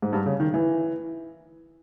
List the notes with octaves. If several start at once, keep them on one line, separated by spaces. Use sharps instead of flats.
G#2
G2
C#3
D#3
E3